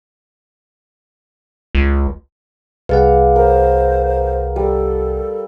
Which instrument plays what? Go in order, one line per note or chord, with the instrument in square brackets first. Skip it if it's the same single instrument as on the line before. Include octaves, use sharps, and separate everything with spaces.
[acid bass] C#2
[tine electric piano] C2 F#5 [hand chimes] G#4 B4 [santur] F5
[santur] A#4 [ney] C5
[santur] G3 [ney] A4